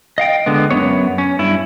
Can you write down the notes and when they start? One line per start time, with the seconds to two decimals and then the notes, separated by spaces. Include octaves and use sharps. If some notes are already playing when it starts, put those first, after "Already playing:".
0.18 D#5 F5 G5
0.46 D3 G#3 B3
0.70 F#2 D#3 B3 C#5
1.18 C#4
1.39 G2 E4